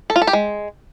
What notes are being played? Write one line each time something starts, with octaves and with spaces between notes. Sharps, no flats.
A4
F4
A4
G4
G#3